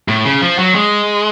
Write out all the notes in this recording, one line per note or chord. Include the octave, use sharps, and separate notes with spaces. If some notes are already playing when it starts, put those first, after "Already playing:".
A2
C#3
F3
F#3
G#3